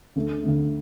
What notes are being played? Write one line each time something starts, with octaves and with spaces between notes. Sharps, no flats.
D2 D3 A3
D2 D3 A3